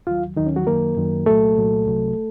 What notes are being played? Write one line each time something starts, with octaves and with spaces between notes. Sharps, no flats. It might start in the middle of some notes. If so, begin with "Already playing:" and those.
D#2 D#3 F#3 F4 F5
D#2 D#3 F#3 D#4
C#4
F#3 F#4
F#2 D#3 F#3 A#3 A#4
F#2 D#3 F#3
C2 A#2 F#3 A3 A4
C2 A#2 F#3
C2 C3 F#3